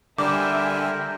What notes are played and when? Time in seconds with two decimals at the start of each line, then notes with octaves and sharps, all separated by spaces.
0.18 D3 G3 A#4 C5 E5 G#5 D6